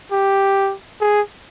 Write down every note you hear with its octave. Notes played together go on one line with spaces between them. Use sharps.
G4
G#4